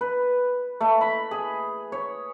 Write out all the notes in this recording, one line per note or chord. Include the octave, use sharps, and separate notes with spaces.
B4
A3
B5
G#4
C#5